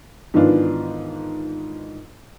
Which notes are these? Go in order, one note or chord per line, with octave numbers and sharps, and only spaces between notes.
G#2 D#3 E3 B3 D4 F4